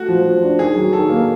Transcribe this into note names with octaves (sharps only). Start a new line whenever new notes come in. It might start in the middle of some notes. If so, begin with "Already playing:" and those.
Already playing: A3 F#4
F3
F3
D4
D#3 G#4
F#3
D#3 A4
A#3